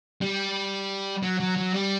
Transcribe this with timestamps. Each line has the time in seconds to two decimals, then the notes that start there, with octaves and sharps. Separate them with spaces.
0.21 G3
1.23 F#3
1.40 F#3
1.58 F#3
1.73 G3